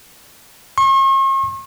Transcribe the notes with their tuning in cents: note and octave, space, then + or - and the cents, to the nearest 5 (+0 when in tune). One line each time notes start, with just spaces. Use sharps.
C#6 -45